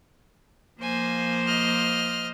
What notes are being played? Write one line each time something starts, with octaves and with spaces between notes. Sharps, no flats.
F3 A#3 C5 G#5
D#5 F6